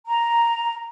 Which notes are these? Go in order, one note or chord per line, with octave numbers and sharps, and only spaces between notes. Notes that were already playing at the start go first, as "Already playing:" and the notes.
A#5